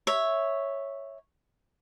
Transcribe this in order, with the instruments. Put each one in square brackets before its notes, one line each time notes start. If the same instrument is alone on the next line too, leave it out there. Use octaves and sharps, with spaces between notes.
[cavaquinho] C#5 E5